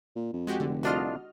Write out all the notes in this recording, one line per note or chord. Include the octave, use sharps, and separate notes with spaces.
A#2
F2
G#3 F#4 G4
F1 D3
C2 D4 F4 F#4 D#5 F6